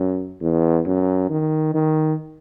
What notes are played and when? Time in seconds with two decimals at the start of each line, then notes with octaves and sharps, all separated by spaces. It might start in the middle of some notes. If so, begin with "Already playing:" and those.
Already playing: F#2
0.41 E2
0.86 F#2
1.30 D#3
1.74 D#3